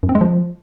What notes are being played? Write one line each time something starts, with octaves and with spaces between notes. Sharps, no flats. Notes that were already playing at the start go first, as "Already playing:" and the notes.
F#2
C4
G#3
F3